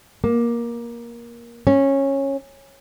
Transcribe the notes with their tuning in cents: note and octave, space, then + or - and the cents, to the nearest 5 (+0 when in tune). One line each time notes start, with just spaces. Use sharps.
A#3 +15
C#4 -15